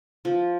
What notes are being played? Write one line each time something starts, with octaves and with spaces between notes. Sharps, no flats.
F3